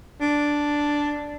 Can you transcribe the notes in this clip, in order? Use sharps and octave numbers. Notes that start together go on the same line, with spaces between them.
D4